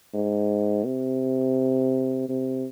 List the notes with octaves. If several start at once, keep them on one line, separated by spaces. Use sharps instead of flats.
G#2
C3
C3